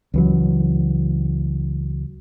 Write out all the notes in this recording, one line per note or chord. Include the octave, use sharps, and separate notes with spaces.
C#2 E3 F#3